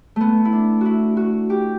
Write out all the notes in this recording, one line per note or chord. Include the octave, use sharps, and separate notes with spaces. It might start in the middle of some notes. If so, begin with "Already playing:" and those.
A3 B3
E4
D4
E4 F#4
F#4
G4